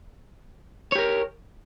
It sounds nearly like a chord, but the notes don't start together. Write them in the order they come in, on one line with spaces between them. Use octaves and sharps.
C#5 G4 A#4